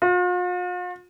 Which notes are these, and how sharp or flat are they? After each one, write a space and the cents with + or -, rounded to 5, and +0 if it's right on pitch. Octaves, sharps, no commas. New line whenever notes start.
F4 +45